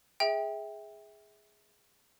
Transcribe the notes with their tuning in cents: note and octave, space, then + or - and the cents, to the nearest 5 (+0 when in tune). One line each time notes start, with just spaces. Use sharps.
G#4 +0 E5 -20 G5 +20